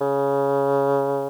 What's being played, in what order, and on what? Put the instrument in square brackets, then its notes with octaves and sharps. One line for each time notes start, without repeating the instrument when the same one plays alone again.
[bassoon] C#3